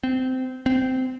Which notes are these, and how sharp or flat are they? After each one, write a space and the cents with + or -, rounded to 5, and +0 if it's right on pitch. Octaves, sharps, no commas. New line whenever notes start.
C4 -20
C4 -15